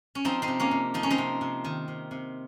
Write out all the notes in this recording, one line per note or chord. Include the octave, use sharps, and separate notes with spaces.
C#4
F3 C4 D#4
C4 D#4
C3
A#3 C#4
C3
F3 D#4
C#4
C4 D#4
C3
C3
D#3
C3
C3